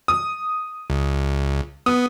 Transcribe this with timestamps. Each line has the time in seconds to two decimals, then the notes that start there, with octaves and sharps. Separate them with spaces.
0.08 D#6
0.90 C#2
1.86 B3 D#6